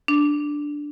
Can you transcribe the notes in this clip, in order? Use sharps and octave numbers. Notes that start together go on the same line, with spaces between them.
D4